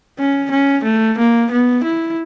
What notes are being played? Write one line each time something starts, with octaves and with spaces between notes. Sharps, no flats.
C#4
C#4
A3
A#3
B3
E4